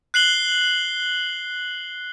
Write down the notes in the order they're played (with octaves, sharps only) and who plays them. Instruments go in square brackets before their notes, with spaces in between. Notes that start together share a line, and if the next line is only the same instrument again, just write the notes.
[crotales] F#6 C7 F#7 G7